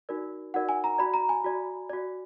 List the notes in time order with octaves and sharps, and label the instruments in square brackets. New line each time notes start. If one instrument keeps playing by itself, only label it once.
[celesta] D#4 F#4 A#4 D5
D#4 F#4 A#4 D5 F#5
G#5
A#5
F#4 D5 B5
A#5
G#5
F#4 D5
F#4 D5